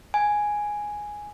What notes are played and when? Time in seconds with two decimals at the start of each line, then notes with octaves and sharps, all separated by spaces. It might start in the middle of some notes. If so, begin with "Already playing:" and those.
0.14 G#5